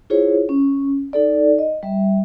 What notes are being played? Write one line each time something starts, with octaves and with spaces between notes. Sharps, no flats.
E4 F4 G#4 C5 C#5
C#4
D#4 A4 D5
D#5
G3 E5